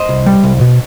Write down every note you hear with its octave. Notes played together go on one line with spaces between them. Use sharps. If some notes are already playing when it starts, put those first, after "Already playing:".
Already playing: C5 D#5
C2
G3
C2
B2